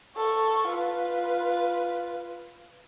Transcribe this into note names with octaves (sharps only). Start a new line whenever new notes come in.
A4 C#6
F4 B4